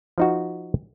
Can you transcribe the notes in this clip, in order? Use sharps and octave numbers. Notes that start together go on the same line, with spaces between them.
F3 D#4 F#4